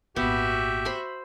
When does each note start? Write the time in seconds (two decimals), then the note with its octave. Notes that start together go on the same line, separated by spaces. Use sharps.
0.16 G#1 A#2 B3 F#4 G4 E5
0.85 C5 B5 C6